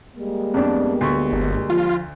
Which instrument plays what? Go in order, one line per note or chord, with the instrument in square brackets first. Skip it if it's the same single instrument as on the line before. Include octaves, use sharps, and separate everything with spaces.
[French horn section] G3 G#3 A#3
[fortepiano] F2 D4 [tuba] B3
[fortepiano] D2 C#6
[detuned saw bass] G1
[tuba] F3 [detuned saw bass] F4